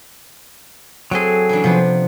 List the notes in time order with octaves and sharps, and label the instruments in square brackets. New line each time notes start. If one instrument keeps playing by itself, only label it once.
[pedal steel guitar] F#3 G#4 [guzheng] C4 A4 C6
[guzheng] C#3 E3 D4
[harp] C3 F3 [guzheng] B3 D4 B4